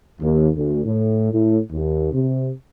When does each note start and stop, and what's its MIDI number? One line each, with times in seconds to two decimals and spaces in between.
0.20 0.49 39
0.56 0.82 38
0.84 1.27 45
1.32 1.59 45
1.71 2.11 39
2.12 2.49 48